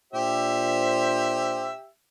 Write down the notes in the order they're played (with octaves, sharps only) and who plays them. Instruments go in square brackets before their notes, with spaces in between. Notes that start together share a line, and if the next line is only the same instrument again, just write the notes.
[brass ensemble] A#2 D4 C5 [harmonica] G4 E5